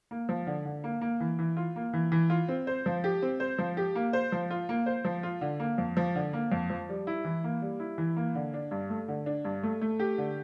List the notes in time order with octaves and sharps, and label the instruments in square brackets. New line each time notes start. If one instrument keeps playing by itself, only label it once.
[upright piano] A#3
F3
D3
D3
A#3
A#3
E3
E3
F4
A#3
E3
E3
F4
C4
C5
F3
G4
C4
C5
F3
G4
A#3
C5
F3
F4
A#3
C5
F3
F4
D3
A#3
F2
F3
D3
A#3
F2
F3
G3
E4
E3
A#3
G3
E4
E3
A#3
D3
D4
G2
A3
D3
D4
G2
A3
A3
G4
D3